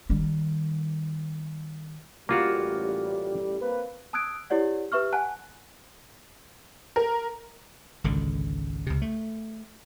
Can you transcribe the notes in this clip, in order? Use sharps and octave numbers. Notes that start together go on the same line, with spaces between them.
D#3 G3
A1 G3 A#3 F4 F#4
A#3 C4 B4
A5 D#6 E6 F#6 G#6 D7
E4 G4 C#5 D5 F#5
G4 B4 E5 C#6 F6
F#5 G#5 A5 F#6
A#4
G#1 C#2 D3
C#2 C3
A3